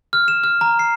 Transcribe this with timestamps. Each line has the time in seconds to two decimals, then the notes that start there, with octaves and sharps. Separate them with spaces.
0.13 F6
0.28 E7
0.44 F6
0.61 A#5
0.79 C7